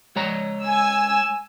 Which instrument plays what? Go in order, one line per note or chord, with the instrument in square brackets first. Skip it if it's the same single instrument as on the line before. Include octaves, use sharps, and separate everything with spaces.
[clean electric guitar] G#3 C#5 A#5
[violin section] G#5 E6